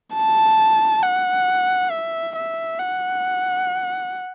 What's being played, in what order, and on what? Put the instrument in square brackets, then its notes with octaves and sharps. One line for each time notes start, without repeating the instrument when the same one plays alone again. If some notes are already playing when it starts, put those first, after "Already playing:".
[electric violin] A5
F#5
E5
E5
F#5